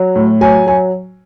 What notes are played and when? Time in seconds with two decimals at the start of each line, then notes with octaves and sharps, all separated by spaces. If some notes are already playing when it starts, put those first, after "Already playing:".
Already playing: F#3
0.16 A2
0.41 F#3 G#5
0.67 F#3 G#5